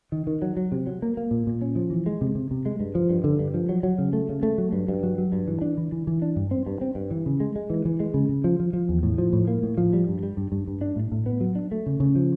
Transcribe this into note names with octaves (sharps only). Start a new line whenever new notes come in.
D#3
D#3
F#3
F#3
C3
F#3
A#3
A#3
A#2
A#2
C#4
F3
E3
G#3
C3
C3
C3
G#3
G2
F3
G2
D3
G2
F3
F#3
F#3
C#3
A3
C#3
A3
F#3
G2
G2
F#3
F#3
G2
E3
D4
E3
E3
E3
D4
G2
C4
G2
C4
G2
E3
C#3
G#3
G#3
E3
E3
G#3
C#3
C#3
F3
F3
F3
E2
A2
F3
A2
A#3
A2
F3
G3
G2
G3
G2
G2
G2
D4
A2
A2
B3
F#3
D4
A3
C#3
C#3
F3